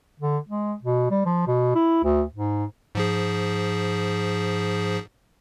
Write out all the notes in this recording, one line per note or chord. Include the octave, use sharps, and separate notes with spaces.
D3
G#3
B2
G3
F3
B2
E4
D2
G#2
G#2 F3 G#4